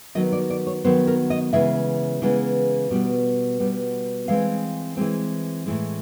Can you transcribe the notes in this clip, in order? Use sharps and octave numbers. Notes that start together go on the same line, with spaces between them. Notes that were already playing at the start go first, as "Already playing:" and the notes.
D#3 F#3 B3 D#5
D5
D5
C#5
D#3 F#3 B3 C5
A#4
D#5
C#3 E3 G#3 B3 E5
C#3 E3 G#3 B3
B2 G3 B3
B2 G3 B3
E3 G#3 C4 F5
E3 G#3 C4
A2 E3 G#3